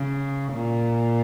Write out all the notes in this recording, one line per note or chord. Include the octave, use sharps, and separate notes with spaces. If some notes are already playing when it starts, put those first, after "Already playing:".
Already playing: C#3
A#2